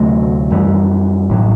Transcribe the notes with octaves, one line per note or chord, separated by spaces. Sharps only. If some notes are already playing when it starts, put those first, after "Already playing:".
Already playing: D2 C3 F#3 A3
F#2 E3 G3
A1 A2 F#3